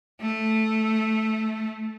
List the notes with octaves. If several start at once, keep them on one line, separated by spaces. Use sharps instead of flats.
A3